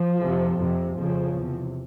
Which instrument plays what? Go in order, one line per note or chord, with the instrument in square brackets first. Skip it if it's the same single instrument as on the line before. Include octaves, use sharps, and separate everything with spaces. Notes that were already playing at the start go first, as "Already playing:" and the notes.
Already playing: [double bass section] F3
F2 C3
F2 C3
F2 C#3 F3
E2 C3